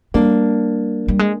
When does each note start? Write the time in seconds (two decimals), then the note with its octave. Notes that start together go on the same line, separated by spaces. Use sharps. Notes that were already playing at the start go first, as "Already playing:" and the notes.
0.14 G3 A#3 D4
1.08 G3
1.19 G#3